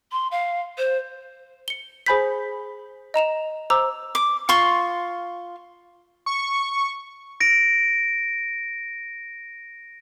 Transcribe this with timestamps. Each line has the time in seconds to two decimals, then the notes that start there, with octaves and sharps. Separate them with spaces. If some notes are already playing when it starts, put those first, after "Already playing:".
0.12 C6
0.31 F5
0.78 C5
1.68 C#7 G7
2.06 G#4 C5 G#5 B5 G6 B6
3.14 D#5 A#5 E7 F7
3.70 C5 A#5 D6 E6 F7
4.15 D6
4.49 F4 C6 C#6
6.26 C#6
7.40 A#6 D7